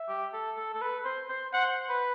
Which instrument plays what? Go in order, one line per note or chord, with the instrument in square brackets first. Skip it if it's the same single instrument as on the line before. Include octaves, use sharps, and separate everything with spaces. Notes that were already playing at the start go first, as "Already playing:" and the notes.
Already playing: [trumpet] E5
[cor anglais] G4
A4
A4
A4
B4
C5
C5
[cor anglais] C5 [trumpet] F#5
[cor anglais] B4